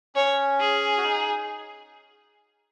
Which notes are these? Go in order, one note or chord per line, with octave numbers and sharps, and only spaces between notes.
C#4 C#5
G#4
F#4
D#4